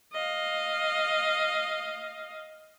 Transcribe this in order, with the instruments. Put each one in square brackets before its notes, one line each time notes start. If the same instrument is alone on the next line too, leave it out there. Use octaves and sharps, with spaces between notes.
[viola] D#5 F5